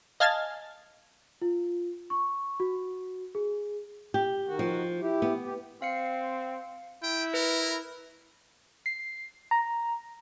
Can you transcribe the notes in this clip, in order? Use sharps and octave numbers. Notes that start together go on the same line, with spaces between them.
D#5 F5 G#5 A5 F6 A6
F4
C#6
F#4
G#4
G4
D#3 F#4
F3
E4 G4
B3
G4
C4 F5 C7 C#7
E4 G5
A#4 B4
C7
A#5